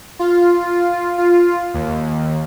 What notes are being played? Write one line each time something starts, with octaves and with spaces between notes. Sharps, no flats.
F4
F4
D#2